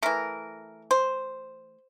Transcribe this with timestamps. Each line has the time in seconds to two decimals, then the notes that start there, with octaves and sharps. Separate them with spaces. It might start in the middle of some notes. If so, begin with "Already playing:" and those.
0.03 E3 A3 A#4
0.91 C5